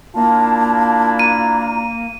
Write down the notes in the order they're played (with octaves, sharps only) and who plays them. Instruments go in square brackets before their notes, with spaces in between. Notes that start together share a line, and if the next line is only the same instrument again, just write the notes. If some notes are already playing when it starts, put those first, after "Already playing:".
[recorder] A#3 [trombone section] D4 E4 F4 [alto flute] A5
[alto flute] A#5 [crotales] D#7